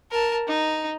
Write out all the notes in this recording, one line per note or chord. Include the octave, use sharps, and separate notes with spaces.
A#4 A5
D#4